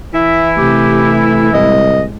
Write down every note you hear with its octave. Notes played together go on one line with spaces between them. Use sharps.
E3 E4 E5
C3 A3 G4
C2 A2 G#3 D#5